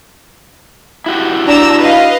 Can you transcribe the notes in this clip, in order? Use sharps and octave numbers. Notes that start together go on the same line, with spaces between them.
E4 F#4 G4
D4 A#5 E6
B4 D#5 F5